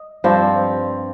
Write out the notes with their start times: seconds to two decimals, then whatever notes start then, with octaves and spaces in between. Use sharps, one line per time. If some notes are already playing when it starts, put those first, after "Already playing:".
Already playing: D#5
0.24 G2 F3 C4